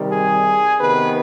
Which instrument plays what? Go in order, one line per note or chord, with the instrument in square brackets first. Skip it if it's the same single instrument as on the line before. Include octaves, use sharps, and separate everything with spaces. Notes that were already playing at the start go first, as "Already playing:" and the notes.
Already playing: [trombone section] C3 D#3 G3
G#4
C3 D#3 B3 B4